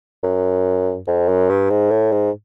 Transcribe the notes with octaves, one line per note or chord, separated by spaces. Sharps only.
F#2
F2
F#2
G2
G#2
A2
G#2